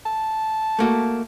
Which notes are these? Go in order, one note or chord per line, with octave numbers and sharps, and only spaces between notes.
A5
A3 A#3 F#4